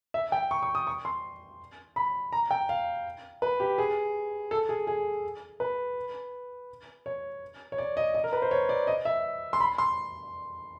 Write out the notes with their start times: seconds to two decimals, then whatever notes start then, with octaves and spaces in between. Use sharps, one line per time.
0.14 E5
0.32 G5
0.51 C#6
0.63 C#6
0.75 D#6
0.87 C#6
1.05 C6
1.96 B5
2.33 A#5
2.51 G5
2.69 F5
3.42 B4
3.60 G4
3.78 G#4
4.51 A4
4.69 G#4
4.87 G#4
5.60 B4
7.06 C#5
7.72 C#5
7.78 D5
7.97 D#5
8.14 D#5
8.24 A#4
8.33 B4
8.42 C5
8.51 C#5
8.69 D5
8.87 D#5
9.05 E5
9.53 C6
9.60 B5
9.78 C6